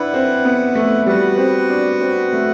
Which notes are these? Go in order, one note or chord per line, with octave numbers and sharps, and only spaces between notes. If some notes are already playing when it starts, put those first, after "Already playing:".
Already playing: D4 E4 B4 F#5
C4
B3
A3
G3 B3 F#4 B4 F#5
C4
D4
C4
A3